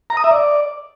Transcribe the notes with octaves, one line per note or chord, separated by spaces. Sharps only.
A#5
D#6
E5
D5